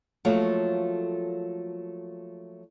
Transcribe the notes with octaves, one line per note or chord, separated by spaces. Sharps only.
F3 F#3 A3 A#3 F4 C#5